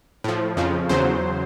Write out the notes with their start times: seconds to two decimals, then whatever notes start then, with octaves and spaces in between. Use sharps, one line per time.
0.24 A2 F3
0.57 F2 C#3 F3
0.89 E2 C#3 F#3 C5